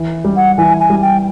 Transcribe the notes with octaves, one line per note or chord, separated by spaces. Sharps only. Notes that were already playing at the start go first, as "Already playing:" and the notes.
Already playing: E3
G3
F#5
E3 G#5
G#5
G3
G5